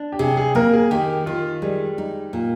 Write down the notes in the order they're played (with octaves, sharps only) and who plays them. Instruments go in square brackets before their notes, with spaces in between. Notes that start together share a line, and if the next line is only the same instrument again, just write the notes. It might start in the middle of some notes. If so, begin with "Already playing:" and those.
Already playing: [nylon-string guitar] D4
[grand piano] G4
[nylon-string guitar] C3 [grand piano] G#4
[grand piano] G#4
[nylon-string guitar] A#3 [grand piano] A#4
[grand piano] G#4
[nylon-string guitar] D#3 [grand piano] G4
[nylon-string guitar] D#3 [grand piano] F4
[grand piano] G3 [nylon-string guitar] G#3
[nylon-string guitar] D#4
A#2